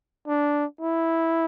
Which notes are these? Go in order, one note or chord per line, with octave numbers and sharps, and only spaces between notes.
D4
E4